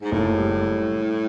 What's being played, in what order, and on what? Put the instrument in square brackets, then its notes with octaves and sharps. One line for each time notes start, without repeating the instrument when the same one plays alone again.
[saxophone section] G#2
[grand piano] F#1 [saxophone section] A2
[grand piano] G3